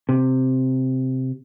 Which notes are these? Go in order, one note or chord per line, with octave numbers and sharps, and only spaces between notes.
C3